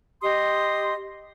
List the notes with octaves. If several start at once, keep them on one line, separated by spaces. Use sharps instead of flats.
G4 D#5 C6 D#6